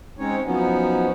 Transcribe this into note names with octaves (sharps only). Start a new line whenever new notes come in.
G#3 C4 C#4 D#4 C#5
F3 F#3 B3 C#4 D#4